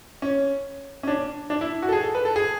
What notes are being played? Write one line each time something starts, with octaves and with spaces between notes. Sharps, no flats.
C#4
C#4
D4
D4
E4
F#4
A4
G#4
A4
B4
A4
G#4